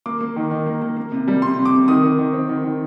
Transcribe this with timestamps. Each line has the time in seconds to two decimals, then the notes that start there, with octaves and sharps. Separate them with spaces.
0.06 A#3 D6
0.21 A#3
0.36 D#3
0.51 D#3
0.66 A#3
0.82 A#3
0.97 A#3
1.12 C3
1.28 G3
1.42 C3 C6
1.58 C3
1.65 D6
1.73 C3
1.88 D#3 D#6
2.04 D#3
2.19 D#3
2.33 C4
2.49 D#3
2.64 D#3